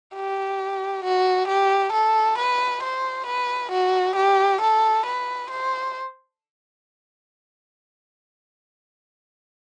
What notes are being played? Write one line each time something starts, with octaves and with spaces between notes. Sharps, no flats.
G4
F#4
G4
A4
B4
C5
B4
F#4
G4
A4
B4
C5